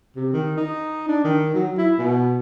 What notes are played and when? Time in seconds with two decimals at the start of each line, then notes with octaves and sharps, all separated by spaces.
0.16 C3
0.33 D#3
0.57 D#4
1.09 D4
1.24 D#3
1.55 F#3
1.78 E4
1.99 B2